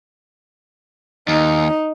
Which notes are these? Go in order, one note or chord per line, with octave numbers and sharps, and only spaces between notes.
D#2 D#4